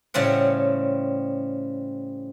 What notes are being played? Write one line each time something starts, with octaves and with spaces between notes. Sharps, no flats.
A2 C#3 G3 C4 F#5